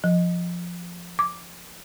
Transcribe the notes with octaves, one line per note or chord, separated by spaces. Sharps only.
F3
D6